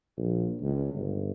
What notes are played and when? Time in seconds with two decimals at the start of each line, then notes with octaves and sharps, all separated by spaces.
0.17 A#1
0.61 C#2
0.94 G1